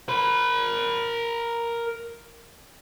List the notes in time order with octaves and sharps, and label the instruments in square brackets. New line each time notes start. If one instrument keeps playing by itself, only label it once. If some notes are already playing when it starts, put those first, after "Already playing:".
[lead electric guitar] A#4 B5